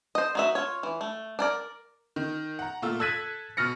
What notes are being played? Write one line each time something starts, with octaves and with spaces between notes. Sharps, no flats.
C5 D#5
D#4 F#4 E5
F4 C#5
E3
A3
D4 A#4 D5
D#3
F#5 A#5
A#2 A3 F4 E6
A4 E6 F#6 G#6 B6 D#7
B2 F6 A#6 C#7